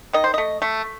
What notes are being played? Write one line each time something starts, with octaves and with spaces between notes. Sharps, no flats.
D#3 D#5
C5
A3 D#5
A3